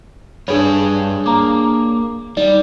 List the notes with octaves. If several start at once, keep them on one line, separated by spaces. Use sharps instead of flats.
G2 D4 G#4 B4 C#5
A#3 A#5 D6
G3 D#4 D5